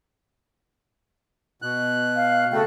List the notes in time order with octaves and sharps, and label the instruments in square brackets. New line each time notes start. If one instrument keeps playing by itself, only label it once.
[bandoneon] B2 F#6
[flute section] F5
[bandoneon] C#3 A3 [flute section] F#4 A4 G5